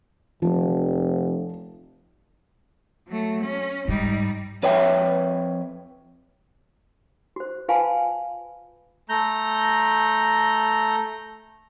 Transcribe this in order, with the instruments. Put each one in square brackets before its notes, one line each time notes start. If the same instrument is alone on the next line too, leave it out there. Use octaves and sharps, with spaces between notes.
[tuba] F1 [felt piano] F3
[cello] F#3 A3
C#4
[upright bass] G#2 [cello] G3 D#4
[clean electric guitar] F2 B4 C#5 E5 G5
[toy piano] F#4 C5
F4 B4 F5 G#5 A5 B5
[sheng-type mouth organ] A3 A#5 G6